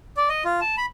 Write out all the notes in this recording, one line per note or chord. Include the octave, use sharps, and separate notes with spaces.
D5
D#5
F4
A5
B5